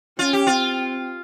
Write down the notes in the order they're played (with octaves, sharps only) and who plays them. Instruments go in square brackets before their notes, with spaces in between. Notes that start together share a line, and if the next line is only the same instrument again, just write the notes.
[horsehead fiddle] C#4 [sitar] F4
[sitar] G4
[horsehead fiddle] C4 [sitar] F4